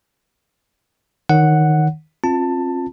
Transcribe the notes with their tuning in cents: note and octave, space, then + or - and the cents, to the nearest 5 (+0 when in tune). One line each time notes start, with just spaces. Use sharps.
D#3 +0 C#5 +0 F#5 +0
C4 +35 F4 +5 A5 +15